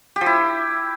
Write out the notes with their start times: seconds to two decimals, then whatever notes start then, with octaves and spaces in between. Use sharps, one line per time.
0.16 G4
0.21 F3
0.26 E4